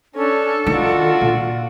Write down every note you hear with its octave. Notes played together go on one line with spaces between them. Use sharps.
C#4 D4 A4
D#3 D4 F4 F#4
A#2